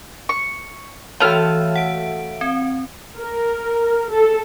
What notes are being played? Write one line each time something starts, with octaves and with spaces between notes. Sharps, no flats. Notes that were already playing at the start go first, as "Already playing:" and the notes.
C#6
E3 A3 F#4 C#5 F5 F6
F#5 D7
C4
A#4
A4